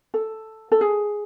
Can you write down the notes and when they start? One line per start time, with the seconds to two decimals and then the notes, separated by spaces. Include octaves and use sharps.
0.14 A4
0.72 A4
0.81 G#4